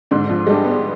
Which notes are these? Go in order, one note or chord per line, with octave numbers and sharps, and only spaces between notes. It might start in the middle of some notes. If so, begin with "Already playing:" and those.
G#2 D3 D4
F3 F4
G3 G#3 D4 G4
B3